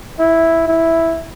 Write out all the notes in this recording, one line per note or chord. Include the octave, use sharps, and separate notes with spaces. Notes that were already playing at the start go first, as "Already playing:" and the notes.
E4
E4